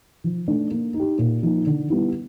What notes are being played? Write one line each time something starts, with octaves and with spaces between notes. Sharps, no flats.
F3
A3 D4
A#3
D#4
G4
A#2
F3 A#3 D#4
D3
G3 B3 E4